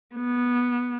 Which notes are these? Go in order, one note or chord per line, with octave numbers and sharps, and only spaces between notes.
B3